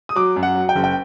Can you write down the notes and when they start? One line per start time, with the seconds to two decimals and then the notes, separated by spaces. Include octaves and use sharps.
0.09 D#6
0.16 F#3 D6
0.36 F#2
0.43 F#5
0.55 F#3
0.69 G5
0.75 F#1
0.84 G5